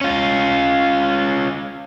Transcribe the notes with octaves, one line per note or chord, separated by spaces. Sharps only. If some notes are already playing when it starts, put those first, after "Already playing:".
C#4 F4